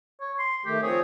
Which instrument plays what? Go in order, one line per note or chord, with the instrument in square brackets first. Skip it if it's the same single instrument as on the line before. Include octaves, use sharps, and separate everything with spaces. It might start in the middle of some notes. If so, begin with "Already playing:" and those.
[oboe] C#5
C6
[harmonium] D#3 A3 [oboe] G4
[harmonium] F3 C4 C#5 [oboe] G#4